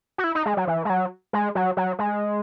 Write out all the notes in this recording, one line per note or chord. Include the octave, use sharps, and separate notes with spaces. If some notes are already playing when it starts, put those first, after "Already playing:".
F#4
E4
D#4
G#3
F#3
E3
G#3
F#3
G#3
F#3
F#3
G#3